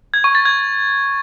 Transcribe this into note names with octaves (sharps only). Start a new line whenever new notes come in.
G#6
C#6
A6
G#6